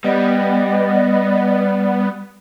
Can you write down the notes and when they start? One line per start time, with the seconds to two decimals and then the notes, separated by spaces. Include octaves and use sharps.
0.04 G3 B3 D5 D#5